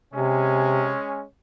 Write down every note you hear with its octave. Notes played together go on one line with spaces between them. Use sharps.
C3 G#3 C#4